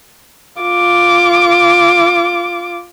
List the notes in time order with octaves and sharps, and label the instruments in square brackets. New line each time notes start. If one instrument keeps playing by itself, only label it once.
[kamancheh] F4 D6